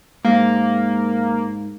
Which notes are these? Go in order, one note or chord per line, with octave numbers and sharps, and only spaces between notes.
G#2 A#3